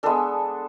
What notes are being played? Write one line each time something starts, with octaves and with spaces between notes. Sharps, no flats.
G#3 B3 D4 A4